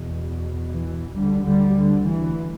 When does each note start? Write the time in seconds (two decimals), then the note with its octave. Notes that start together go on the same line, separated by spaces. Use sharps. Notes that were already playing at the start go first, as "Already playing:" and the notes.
Already playing: E2 B2
0.69 E3
1.15 D2 D3 G3
1.45 D3 G3
1.76 D3
2.06 E3